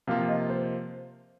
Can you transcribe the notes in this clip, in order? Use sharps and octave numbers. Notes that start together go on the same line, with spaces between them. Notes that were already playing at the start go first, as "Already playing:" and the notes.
C3 F3 A#3 F4 F5
D#5
C5